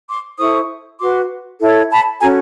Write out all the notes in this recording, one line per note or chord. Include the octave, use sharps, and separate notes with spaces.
C6 D6
E4 A4 C5 C#6 D#6
F#4 B4 C6 D6
E4 A4 C#5
A5 B5
C#4 F#4 A4 G#5 A#5